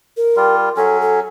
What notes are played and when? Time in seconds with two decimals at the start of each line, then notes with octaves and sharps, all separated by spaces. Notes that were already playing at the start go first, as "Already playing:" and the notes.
0.17 A#4
0.36 G3 F4
0.77 F#3 C#4 A4
1.01 A4